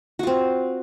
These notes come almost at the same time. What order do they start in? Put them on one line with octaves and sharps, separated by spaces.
F#4 F4 C4